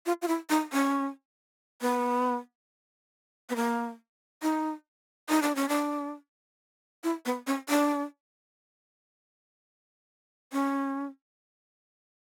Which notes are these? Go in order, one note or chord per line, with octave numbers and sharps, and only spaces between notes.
F4
F4
E4
D#4
C#4
B3
B3
A#3
D#4
D#4
D4
C#4
D4
E4
B3
C#4
D4
C#4